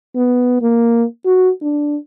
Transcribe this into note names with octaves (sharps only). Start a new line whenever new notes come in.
B3
A#3
F#4
D4